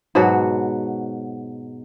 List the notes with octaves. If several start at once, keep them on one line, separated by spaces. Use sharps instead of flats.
G#2 B2 F#3 F#4